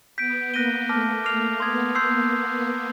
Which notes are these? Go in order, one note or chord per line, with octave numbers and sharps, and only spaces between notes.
B3 G6 B6 D7
A#3 F#6 A#6 D#7 G7
A3 A5 D6 F6 A#6
A#3 D6 F6 A6 C7 F7
B3 C6 D#6 G#6
A#3 C6 E6 G6 C7